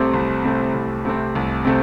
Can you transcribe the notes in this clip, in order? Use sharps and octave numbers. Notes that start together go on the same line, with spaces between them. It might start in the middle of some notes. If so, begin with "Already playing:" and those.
Already playing: C2 C3 A3 C4
C2
C3 A3 C4
C2
C3 A3 C4
C2
C3 A3 C4